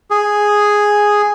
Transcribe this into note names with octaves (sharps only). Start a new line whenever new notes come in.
G#4